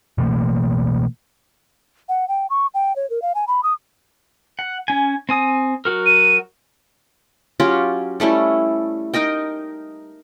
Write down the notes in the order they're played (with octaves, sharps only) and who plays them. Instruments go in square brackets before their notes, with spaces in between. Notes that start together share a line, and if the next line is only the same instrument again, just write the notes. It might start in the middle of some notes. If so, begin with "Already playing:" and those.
[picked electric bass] B2 E3 A3 A#3
[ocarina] F#5
G5
C#6
G5
C#5
A#4
F5
G#5
B5
D#6
[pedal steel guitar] F#5
C#4 G#5
C4 G#5 D#6
F#3 F#4 A#4
[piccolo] D#7
[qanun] F#3 C#4 F4 G4
G3 A3 C#4 E4
D#4 A#4 D#5 G5